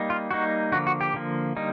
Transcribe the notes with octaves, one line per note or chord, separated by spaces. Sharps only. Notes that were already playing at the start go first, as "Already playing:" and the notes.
Already playing: G3 A#3 D#4
F4
G3 A#3 D#4 F#4
D3 F3 A#3 F#4
F#4
G4
D3 F3 A#3
D3 G3 A#3 D#4